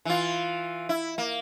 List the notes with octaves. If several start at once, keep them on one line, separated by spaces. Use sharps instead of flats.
E3 F4
E4
A#3